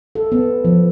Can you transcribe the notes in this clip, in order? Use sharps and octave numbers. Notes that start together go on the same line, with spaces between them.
A4
B3
F3